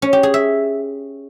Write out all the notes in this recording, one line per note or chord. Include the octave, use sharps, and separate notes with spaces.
C#4
G4
G#4
E5